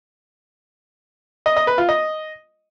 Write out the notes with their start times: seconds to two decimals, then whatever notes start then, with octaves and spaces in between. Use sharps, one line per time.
1.46 D#5
1.57 D#5
1.67 B4
1.78 F4
1.89 D#5